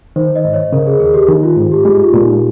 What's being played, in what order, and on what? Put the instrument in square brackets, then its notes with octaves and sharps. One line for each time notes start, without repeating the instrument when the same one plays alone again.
[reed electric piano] D#3 [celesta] C5
[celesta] D#5
[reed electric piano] G#2
[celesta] C#5
[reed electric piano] C#3 [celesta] A#4
[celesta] G#4
[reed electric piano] D#2 [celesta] G#4
[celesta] G4
[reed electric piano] D#3 [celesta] D#4
[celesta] F4
[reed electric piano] G#2
[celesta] G4
[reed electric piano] G#3 [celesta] G4
[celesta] F4
[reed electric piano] A#2
[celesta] D#4